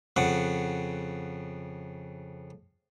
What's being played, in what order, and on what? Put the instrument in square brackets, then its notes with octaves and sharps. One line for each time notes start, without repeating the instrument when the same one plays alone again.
[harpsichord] F2 C#3 F#5